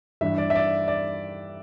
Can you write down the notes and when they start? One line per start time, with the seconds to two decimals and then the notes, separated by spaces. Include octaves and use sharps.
0.21 G2 E3 G3 E5
0.38 D5
0.50 E5
0.55 D5
0.88 D5